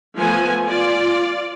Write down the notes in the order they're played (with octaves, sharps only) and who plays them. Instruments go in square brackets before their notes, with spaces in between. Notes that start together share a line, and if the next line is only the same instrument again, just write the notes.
[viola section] F3 A3 B3 G#5
F4 D5